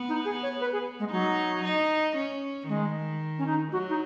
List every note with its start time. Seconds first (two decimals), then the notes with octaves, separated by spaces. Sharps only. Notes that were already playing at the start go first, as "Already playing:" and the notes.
Already playing: B3
0.09 D#4
0.25 G#4
0.43 C#5
0.61 B4
0.73 G#4
0.99 G#3
1.11 F#3 D#4
1.64 D#4
2.16 C#4
2.68 D#3 G#3
3.38 C#4
3.47 D#4
3.72 F#3 F#4
3.89 D#4